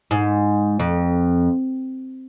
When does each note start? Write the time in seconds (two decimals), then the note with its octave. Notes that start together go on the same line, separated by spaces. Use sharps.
0.11 G#2
0.80 F2